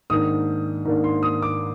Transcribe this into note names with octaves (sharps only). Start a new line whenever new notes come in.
G#2 D#3 A#3 D4 D#6
G#2 D#3 A#3 D4
C6
D#6
D6